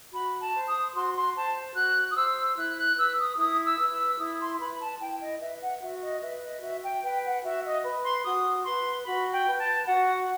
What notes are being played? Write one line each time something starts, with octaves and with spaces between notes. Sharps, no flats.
F#4 B5
A5
C5
D#6
F#4 C6
C6
C5 A5
F#4 F#6
D#6
C5 E6
E4 F#6
F#6
B4 E6
D#6
E4 D#6
E6
B4
E6
E4 D#6
C6
B4 B5
A5
E4 G5
D#5
B4 E5
F#5
F#4 E5
D#5
B4 E5
D#5
F#4 E5
G5
B4 G5
F#5
F#4 E5
D#5
B4
C6
F#4 D#6
B4 C6
F#4 B5
G5
B4
A5
F#4 F#5